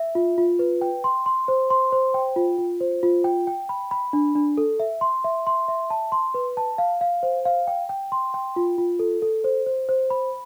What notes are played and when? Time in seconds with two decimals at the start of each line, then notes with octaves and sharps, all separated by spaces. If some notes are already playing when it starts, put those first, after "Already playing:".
Already playing: E5
0.15 F4
0.38 F4
0.59 B4
0.81 G5
1.04 C6
1.26 C6
1.48 C5
1.70 C6
1.92 C5
2.14 G5
2.36 F4
2.58 F4
2.81 C5
3.03 F4
3.24 G5
3.47 G5
3.69 B5
3.91 B5
4.13 D4
4.36 D4
4.58 A4
4.80 E5
5.01 C6
5.24 E5
5.47 C6
5.68 E5
5.90 A5
6.12 C6
6.34 B4
6.57 A5
6.78 F5
7.01 F5
7.23 C5
7.45 F5
7.67 G5
7.89 G5
8.12 C6
8.34 G5
8.56 F4
8.78 F4
8.99 A4
9.22 A4
9.44 C5
9.66 C5
9.89 C5
10.10 B5